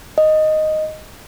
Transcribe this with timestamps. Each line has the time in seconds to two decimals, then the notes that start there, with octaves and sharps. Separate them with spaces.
0.18 D#5